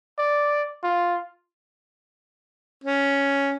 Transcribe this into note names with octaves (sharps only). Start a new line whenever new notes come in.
D5
F4
C#4